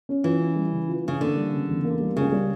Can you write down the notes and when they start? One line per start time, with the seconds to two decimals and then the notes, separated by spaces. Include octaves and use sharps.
0.09 C#4
0.24 E3 F4
0.40 C#4
0.56 G3
0.72 C#3
0.88 F4
1.04 C#3 C#4
1.20 D3 A#3
1.36 G3
1.53 C#3
1.68 E2
1.84 A#3
2.00 G3
2.16 C#2 C#3
2.32 G3